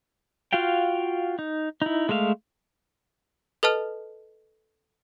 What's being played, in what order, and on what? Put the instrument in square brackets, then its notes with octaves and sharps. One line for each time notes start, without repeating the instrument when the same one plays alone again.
[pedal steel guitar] F4 F#4 F5 G5
D#4
D#4 E4
G#3 A3 E5 F5
[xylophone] A4 B4 D#5 A5 F6